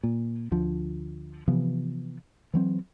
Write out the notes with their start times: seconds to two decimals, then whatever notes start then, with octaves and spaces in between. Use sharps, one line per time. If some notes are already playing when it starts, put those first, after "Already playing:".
0.04 A#2
0.51 D2 D3 F3
1.48 C3 E3 F3 B3
2.54 E3 F#3 C4